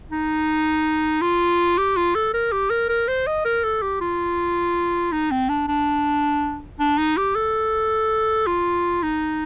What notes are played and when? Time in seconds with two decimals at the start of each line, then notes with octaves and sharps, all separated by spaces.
0.11 D#4
1.22 F4
1.78 G4
1.97 F4
2.15 A4
2.34 A#4
2.52 G4
2.70 A#4
2.89 A#4
3.08 C5
3.27 D#5
3.45 A#4
3.64 A4
3.82 G4
4.01 F4
5.13 D#4
5.31 C4
5.49 D4
5.68 D4
6.80 D4
6.98 D#4
7.17 G4
7.36 A4
8.47 F4
9.03 D#4